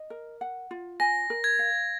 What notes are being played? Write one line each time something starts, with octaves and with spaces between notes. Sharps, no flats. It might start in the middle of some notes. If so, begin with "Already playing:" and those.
Already playing: D#5
A#4
F#5
F4
G#5 A#6
A#4
G#6
F5